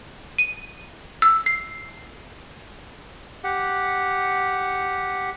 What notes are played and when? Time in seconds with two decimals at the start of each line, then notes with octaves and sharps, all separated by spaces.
0.38 D#7
1.22 E6
1.46 C7
3.44 G4 F#5